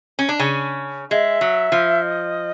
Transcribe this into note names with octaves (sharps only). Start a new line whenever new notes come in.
C#4
D4
C#3 C#4
G#3 E5
F#3
F3
D#5